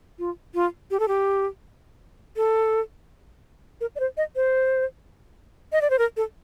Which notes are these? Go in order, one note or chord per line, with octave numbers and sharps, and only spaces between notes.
F4
F4
G4
A4
G4
A4
A#4
D5
C5
D#5
C5
D#5
D5
C5
A#4
A4